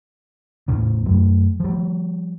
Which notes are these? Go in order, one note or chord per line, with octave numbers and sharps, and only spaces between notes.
E2 A2 C#3
F#2 F#3 A3
F3 G3